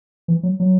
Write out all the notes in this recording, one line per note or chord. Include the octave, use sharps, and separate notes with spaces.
E3
F#3
F#3